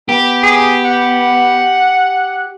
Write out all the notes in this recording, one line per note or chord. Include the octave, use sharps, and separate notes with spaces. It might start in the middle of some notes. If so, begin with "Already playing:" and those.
B3 G4
G#4
F#5